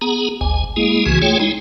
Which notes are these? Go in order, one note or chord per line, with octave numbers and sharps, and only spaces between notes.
B3 G#4 A#5
G#1 D2 G#5
G#3 A#3 E4 G#4
C2 C#3 E3 F#4 G#5
A3 F4 G#4 C#5 G5
G#3 D#4 E4